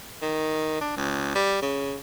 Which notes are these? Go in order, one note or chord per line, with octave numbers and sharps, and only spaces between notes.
D#3
D4
C#2
G3
C#3